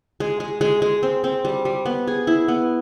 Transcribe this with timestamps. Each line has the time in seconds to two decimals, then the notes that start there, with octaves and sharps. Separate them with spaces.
0.20 G#3
0.40 G#3
0.61 G#3
0.82 G#3
1.03 C4
1.24 C4
1.45 G3
1.65 G3
1.86 B3
2.08 G#4
2.27 E4
2.48 B3